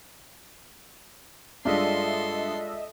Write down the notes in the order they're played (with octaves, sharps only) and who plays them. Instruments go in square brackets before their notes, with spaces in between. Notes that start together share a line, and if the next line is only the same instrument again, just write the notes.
[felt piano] G2 [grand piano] G#3 D4 F4 [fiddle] A4 C6 [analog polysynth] D#5 E5